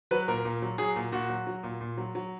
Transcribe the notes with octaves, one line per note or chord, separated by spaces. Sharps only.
F#3 B4
A#2 A#4
A#2
F#3
F#3 G#4
A#2
A#2 F#4
F#3
F#3
A#2
A#2
F#3
F#3